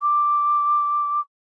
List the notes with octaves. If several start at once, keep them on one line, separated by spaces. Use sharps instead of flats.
D6